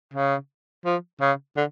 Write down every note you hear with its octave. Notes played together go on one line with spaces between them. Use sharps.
C#3
F3
C#3
D3